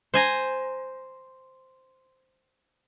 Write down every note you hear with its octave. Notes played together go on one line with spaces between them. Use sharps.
C5 G#5 A#5